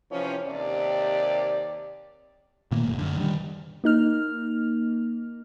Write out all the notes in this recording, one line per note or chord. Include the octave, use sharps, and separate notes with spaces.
C3 E3 F3 C#4
D#2 C3 G4 D5
A#2 D#3 A3 A#3
F#1
F#2 D3
D#3 G3
A#3 D#4 F6